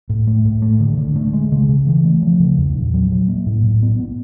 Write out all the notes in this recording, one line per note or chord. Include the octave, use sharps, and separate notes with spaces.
A2
A3
A2
A3
D3
D3
A3
G#3
C#3
C#3
E3
A3
F3
C#3
E2
A#2
F#3
F#3
A#3
A2
A2
B3
B3